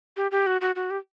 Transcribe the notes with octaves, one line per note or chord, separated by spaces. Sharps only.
G4
G4
F#4
F#4
F#4
G4